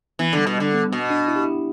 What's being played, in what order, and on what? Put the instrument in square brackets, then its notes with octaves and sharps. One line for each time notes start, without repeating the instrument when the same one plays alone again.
[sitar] E3 [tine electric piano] B3
[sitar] D3 [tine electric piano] G3
[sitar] B2
[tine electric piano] G3
[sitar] D3
[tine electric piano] B3
[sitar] B2 [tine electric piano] B3
[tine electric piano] D4
E4
G4
E4